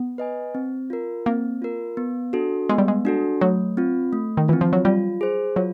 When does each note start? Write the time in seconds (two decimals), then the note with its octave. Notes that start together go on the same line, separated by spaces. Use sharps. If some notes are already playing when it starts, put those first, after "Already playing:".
Already playing: B3
0.18 B4 D#5 G#5
0.55 C4
0.90 F4 A#4
1.26 A#3 C4
1.62 F4 A#4
1.97 B3
2.33 D4 F#4 A4
2.69 G#3 B3
2.78 G3
2.88 G#3
3.05 D4 F#4 A4
3.41 F#3 A3
3.77 C4 F4
4.13 A3
4.37 D#3
4.48 E3 C4 F4
4.61 F3
4.73 F#3
4.85 G3 F4
5.21 G#4 C5
5.56 F#3 F4